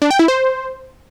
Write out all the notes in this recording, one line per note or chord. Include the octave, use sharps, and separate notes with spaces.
D4
G5
E4
C5